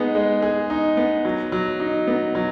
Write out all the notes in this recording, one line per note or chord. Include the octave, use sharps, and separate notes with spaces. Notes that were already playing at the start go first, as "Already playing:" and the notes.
Already playing: G#3 B3 D#4 G#4
G#3
G#4
D#4
B3
F#3
F#3
D#4
B3
F#3